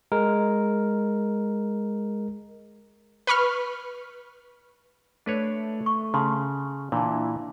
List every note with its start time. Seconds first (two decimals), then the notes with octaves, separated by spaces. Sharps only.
0.12 G#3 A#4
3.27 B4 B5 C#6 F6
5.26 A3 D4 B4 C#5
5.86 C#6
6.14 C#3 A5 C6
6.92 A#2 E3 D4 E4 A5